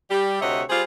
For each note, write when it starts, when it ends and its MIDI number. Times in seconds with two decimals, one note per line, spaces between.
0.10 0.41 55
0.10 0.41 67
0.41 0.63 38
0.41 0.63 48
0.41 0.63 73
0.41 0.63 75
0.41 0.63 76
0.41 0.63 78
0.69 0.82 55
0.69 0.82 65
0.69 0.82 67
0.69 0.82 68
0.69 0.82 72